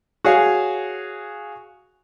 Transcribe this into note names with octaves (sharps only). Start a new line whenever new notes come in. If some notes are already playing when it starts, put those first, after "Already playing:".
F#4 G#4 C#5 F5